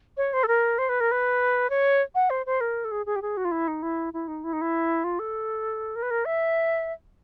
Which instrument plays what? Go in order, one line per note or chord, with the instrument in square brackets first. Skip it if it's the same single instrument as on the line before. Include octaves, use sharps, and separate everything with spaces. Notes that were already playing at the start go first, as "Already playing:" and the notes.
[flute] C#5
C5
A4
A#4
C5
B4
A#4
B4
C#5
F#5
C5
C5
A#4
A4
G#4
G#4
G4
G#4
F#4
F4
E4
D#4
E4
E4
D#4
E4
D#4
E4
F4
A4
A#4
B4
A#4
E5